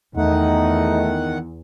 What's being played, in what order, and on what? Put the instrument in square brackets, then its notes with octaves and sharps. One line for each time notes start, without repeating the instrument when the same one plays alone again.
[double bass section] E2 [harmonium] D#3 F#5 [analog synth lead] A3 [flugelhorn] D#4